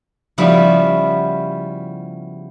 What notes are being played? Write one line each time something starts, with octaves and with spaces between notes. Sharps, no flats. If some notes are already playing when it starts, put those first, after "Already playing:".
C#3 F3 G3 B3 E4 F#4